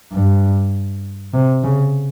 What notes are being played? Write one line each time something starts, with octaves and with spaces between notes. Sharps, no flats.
G2
C3
C#3